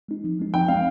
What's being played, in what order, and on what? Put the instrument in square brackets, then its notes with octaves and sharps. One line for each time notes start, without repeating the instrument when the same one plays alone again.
[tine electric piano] G#3 C4 D#4
F3
G#3 C4 D#4
[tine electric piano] F3 [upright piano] G5
[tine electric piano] G#3 C4 [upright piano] F5